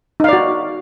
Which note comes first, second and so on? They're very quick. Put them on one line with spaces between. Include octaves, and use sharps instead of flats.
D#4 F5 D5 F#4